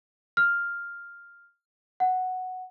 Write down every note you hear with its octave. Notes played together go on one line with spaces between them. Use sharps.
F6
F#5